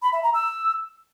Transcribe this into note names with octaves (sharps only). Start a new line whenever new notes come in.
B5
E5
A#5
E6